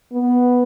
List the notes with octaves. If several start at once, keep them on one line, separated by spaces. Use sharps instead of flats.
B3